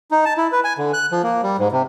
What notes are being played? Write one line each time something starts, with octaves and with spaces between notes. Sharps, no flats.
D#4
A5
E4
B4
G#5
D3
F#6
F3
A#3
G3
G#2
C3